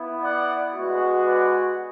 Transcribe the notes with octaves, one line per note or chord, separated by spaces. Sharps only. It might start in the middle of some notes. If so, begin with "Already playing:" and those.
Already playing: B3 E4
D5 F#5
G#3 B3 F#4
B4 D5